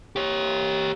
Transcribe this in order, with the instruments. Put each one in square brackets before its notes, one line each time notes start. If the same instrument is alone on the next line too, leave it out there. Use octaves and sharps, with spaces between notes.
[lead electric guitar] G4 C#5